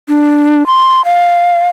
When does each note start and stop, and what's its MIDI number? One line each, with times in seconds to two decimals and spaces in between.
0.09 0.66 62
0.67 1.02 84
1.05 1.69 77